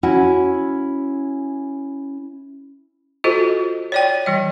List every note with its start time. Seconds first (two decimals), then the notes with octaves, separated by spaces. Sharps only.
0.03 C#4 E4 F#4 F#5
3.24 F4 F#4 A4 C5 D#5
3.92 C#5 D5 G5
4.26 E3 G3 D#5